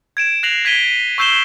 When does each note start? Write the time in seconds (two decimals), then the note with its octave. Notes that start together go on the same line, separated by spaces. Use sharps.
0.17 G#6 D7 E7
0.43 F#6 A#6 C7 F7 F#7
0.65 G#6 B6 D7 D#7 G7
1.18 C#6 E6 G6 C7 E7 G7